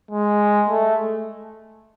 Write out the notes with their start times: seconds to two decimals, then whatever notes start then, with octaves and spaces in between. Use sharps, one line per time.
0.11 G#3
0.69 A3